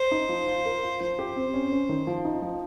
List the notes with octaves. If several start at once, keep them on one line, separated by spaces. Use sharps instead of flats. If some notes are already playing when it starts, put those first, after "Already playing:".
Already playing: C5
D#4
F3
F4
A#4
F4
F3 C5
G4
C4
C#4
C#4
D#3
F3
D#4
F3